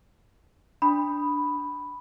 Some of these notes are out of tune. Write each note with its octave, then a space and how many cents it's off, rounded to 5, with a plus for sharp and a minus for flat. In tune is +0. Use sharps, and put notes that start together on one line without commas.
D4 +0 B5 +0 D#6 +0